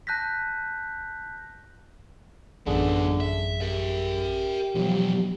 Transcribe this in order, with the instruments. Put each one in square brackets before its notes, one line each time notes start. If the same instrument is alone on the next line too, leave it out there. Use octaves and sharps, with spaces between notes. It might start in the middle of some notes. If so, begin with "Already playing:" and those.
[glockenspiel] A5 F#6 G6 A#6 B6
[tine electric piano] A1 F#2 G#4 [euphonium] D3 [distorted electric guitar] F#3 B3
[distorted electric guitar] E5
[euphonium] G4 [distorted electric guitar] A#4 E5
[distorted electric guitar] E2 B2 [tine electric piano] F3 F#3